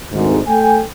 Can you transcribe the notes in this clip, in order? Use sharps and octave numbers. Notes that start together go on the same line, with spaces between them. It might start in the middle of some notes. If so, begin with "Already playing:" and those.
G#1 D2 G#2
A3 A4 G5 G#5